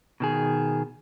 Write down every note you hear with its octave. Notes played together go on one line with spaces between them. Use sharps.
B2 D#3 G#4